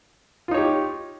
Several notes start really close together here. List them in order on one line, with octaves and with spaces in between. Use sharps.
F4 D#4 C#5 G4